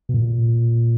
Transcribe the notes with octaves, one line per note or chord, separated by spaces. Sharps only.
B2
A#2